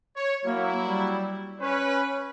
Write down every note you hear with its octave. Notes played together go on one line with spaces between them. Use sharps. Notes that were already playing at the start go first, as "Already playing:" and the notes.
C#5
F#3 A#3 E4
G3
C#4 B4 C#5